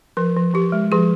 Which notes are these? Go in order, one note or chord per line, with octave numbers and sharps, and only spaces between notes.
F3 A#4
F3
F3 G4
G#3
F3 G#4